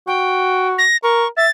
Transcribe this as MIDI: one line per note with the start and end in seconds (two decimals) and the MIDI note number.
0.07 0.84 66
0.07 0.68 79
0.78 0.97 94
1.03 1.26 70
1.03 1.28 85
1.37 1.47 76
1.37 1.50 93